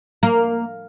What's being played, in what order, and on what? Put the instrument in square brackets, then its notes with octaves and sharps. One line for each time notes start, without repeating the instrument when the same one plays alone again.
[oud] A#3